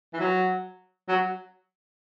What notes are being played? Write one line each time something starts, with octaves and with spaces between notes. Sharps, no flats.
E3
F#3
F#3